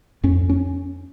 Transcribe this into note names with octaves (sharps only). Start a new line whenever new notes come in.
F2 C#4
C#4